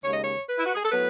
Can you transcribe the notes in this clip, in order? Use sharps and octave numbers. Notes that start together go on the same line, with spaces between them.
D#2 C#3 G#3 C#5
D#5
C#5
B4
E4
F#4
G#4
A4
A2 F#3 B3 B4